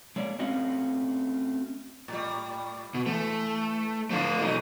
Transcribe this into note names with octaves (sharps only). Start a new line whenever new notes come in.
G#3 A#3 C#5 D5
A3 C4 C#4 F#4 D#5 F5
A2 G3
B2
E3 A3
G#2 D3 F3 A3 F5
B2 E3 F#3 D#4